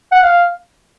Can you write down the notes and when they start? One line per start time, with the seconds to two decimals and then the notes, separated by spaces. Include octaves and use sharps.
0.12 F#5
0.23 F5